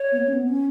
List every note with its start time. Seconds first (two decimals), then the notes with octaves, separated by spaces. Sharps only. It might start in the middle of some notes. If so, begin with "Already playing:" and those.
Already playing: C#5
0.12 B3
0.18 A#3
0.28 C#4
0.33 B3
0.49 C#4